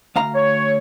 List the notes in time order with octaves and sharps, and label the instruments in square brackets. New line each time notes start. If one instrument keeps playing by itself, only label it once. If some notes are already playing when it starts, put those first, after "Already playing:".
[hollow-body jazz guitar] D2 F5 A#5
[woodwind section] C#5